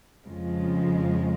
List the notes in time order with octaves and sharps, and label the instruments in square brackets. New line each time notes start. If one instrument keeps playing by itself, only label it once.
[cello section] F2 C#3 F3 G#3